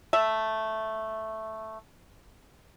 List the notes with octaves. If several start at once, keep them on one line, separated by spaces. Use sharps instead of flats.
A3 E5